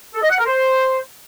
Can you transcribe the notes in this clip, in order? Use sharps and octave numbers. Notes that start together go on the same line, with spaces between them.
A4
D#5
F#5
A#4
C5